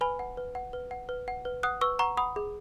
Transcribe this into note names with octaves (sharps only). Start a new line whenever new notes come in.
B4 G#5 B5
F#5
B4
F#5
B4
F#5
B4
F#5
B4
F#5 D#6 F#6
B4 C#6 E6
F#5 A#5 C#6
F#5 B5 D#6
G#4